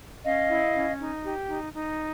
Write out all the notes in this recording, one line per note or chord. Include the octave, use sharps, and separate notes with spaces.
C#4 D#5 F5
E4
C#4
D#4
G4
D#4
D#4